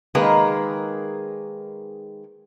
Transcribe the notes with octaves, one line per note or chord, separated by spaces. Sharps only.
D#3 G#3 A#3 G#4 A#4 B4